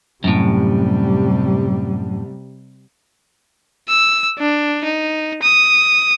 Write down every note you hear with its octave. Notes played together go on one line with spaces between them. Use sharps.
F#2 A2 C3 G3
E6
D4
D#4
D#6